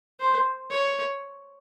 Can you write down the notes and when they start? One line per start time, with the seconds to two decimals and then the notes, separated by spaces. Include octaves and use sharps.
0.20 C5
0.71 C#5